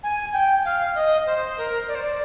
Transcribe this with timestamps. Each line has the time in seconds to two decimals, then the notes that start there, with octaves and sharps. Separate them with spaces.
0.03 G#5
0.33 G5
0.65 F5
0.95 D#5
1.26 C5
1.57 A#4
1.87 D5
1.95 C5
2.02 D5